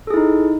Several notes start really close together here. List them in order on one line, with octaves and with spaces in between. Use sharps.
A4 G#4 E4 D#4